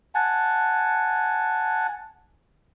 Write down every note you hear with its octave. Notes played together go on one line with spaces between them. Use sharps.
F#5 G#5 A5